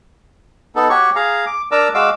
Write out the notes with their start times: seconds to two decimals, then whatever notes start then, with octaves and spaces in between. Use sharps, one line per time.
0.76 B3 D#4 A4
0.90 F#4 G4 C#5 C#6
1.16 G#4 F5 A#5
1.47 D6
1.72 D4 A#4 D5 A#5 D6 E6
1.94 G#3 F#4 F5 D6 E6